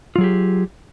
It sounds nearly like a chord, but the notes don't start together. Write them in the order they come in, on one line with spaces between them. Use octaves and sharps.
F4 F#3 G#4 G4